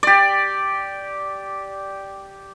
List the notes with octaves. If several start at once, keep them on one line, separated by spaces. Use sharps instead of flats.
G4 D5